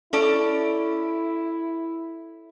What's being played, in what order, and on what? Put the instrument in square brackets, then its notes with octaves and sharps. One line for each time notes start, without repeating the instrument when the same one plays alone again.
[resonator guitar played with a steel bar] C#4 A4 D5 [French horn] E4